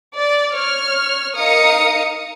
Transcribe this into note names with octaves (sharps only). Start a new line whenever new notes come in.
D5
C#5 F6
D#4 A#4 F5 D#6 C#7